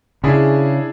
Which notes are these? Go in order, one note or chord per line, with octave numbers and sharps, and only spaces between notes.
C#3 D4 E4 G#4